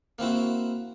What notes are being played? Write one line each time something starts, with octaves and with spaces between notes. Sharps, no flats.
A#3 C4 E4 F#4